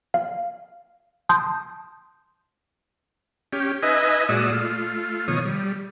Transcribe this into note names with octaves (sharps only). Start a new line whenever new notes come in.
F5
A5 C6 D#6 G6
C#4 G4
D#4 B4 D#5 E5 G#5
A#2 G#3 F#4 D5 D#6 E6
A3 F4
B2 D#3 F3 C#5 D#6
G3